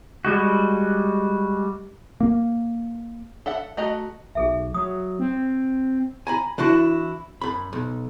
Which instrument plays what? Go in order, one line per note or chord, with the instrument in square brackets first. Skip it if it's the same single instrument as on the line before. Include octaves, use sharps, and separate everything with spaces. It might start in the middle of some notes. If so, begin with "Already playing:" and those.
[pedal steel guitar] G3 G#3 F#4
[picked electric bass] A#3
[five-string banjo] A4 E5 F#5
A3 F#4 D#5 A#5
[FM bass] B1 [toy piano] G#4 A4 E5
[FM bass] F#3 [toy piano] D#6
[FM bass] C4
[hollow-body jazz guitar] G#5 A#5 B5
E3 D4 E4 F#4
F#2 B5
B1